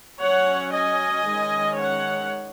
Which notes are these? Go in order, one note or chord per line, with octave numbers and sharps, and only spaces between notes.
F#3 C#4 C#5 F#5
D#5 G#5
D#3 G#3 C#4
C#5 F#5